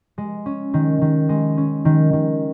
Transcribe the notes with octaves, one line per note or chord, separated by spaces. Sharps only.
G#3
C#4
D#3
D#3
G#3
C#4
D#3
D#3